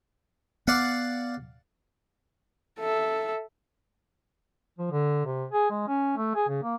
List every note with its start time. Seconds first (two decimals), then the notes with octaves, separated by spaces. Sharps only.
0.68 B3 D5 F5 F#5
2.79 A4 E5
4.79 F3
4.91 D3
5.26 C3
5.52 G#4
5.70 G#3
5.88 C#4
6.17 A3
6.35 G#4
6.48 C#3
6.63 A#3